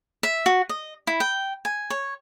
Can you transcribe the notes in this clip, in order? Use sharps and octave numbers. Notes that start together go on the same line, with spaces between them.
E5
F#4
D#5
E4
G5
G#5
C#5